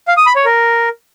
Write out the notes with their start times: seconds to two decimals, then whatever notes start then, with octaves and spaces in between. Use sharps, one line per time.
0.08 F5
0.17 D#6
0.26 B5
0.36 C#5
0.45 A#4